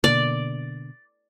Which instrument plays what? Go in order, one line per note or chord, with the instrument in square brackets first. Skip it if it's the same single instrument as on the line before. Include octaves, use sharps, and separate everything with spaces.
[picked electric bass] B2 D3 A#3 [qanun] D5